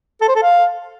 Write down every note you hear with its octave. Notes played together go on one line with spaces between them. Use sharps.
A4
C5
A4
F5